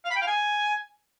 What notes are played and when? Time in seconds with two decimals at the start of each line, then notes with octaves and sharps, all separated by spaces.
0.05 F5
0.11 B5
0.16 G5
0.22 F5
0.27 G#5